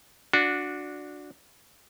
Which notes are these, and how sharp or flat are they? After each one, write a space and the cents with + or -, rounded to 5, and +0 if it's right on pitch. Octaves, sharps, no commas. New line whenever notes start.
D4 +0 F#4 -20